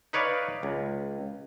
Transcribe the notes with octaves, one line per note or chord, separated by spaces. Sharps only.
D#4 B4 C#5 D5 F5
C#2